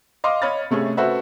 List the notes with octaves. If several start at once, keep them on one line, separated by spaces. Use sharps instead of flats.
D#5 F5 C6 D6
C#5 D#5 B5 F6 A6
C3 A3 C#4 G#4
F#4 A4 B4 C5 E5 F#5